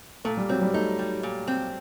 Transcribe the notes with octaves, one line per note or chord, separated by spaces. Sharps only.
A#2 A3
G3
F#3 C4
G3
A3 D#4
G3
A#2
C4